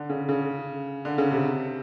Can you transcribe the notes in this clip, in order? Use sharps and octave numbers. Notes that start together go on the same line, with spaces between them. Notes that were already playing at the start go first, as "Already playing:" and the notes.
Already playing: D3
C#3
C#3
D3
C#3
C3